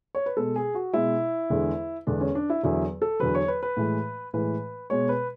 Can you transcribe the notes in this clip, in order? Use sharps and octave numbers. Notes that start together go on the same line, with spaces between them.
C#5
B4
B2 G#3 A4
G#4
F#4
B2 G#3 E4
E2 D3 G#3
E2 D3 G#3 D4
C#4
D4
E4
E2 D3 F#3 E4
A4
E2 D3 F#3 B4
C#5
B4
B4
A2 E3 G#3
A2 E3 G#3 B4
B2 G#3 C#5
B4